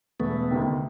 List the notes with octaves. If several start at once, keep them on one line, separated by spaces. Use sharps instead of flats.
E1 A3 B3
D2 C3 D#3